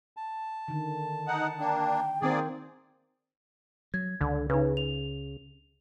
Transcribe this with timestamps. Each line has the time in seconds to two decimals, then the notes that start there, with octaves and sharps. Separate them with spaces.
0.17 A5
0.68 D3 D#3
1.28 D#4 F#5
1.59 A#3 D4 G5
2.22 D#3 A#3 C4 G#4 C5 D5
3.94 F#3 G#6
4.21 C#2 D3
4.50 C#3 D#4 B4
4.77 F7